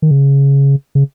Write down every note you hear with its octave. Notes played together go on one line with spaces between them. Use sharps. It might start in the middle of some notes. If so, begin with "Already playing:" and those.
D#3
C#3
C#3